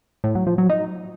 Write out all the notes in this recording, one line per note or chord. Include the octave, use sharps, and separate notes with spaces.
A2
F#3
F3
F#3
D#4